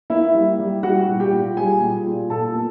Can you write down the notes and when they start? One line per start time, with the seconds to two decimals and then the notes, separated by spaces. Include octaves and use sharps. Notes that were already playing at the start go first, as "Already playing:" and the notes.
0.10 A#3 E4 E5
0.34 G3
0.59 G3
0.83 G3 F#4 F#5
1.07 A#2
1.20 G4 G5
1.32 A#2
1.57 G3 G#4 G#5
1.81 A#2
2.06 A#2
2.30 A#2 A4 A5
2.55 A#3